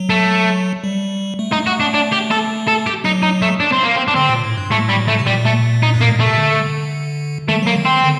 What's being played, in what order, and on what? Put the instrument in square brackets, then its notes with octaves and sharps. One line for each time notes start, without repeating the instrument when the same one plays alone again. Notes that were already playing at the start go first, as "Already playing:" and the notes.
Already playing: [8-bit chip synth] F#3
[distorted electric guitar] A3
[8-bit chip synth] G3
A3
[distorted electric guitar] D#4
F#4
D4
D4
G4
A4
A4
G4
[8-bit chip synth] F#3 [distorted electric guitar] D#4
[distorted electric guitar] D#4
A3
D4
C4
A#3
C4
D4
[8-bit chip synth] D3 [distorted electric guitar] C4
[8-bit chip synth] A#2
A2
G2
[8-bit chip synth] A2 [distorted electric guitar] A3
[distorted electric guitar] G3
A3
[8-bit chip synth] C3
[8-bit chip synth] A#2 [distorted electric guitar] G3
[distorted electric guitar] A3
D#4
[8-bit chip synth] G2
[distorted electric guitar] A#3
[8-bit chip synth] A2
[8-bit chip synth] A#2 [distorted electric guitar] A3
[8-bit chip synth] C3
D3
[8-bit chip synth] D#3 [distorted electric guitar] A3
[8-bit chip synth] F#3 [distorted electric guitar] A#3
[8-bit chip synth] D#3
[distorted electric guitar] C4
[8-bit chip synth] D3